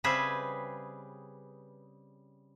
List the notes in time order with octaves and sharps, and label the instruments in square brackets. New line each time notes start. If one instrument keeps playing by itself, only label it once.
[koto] C#3 G3 C4 G#4 B4 E5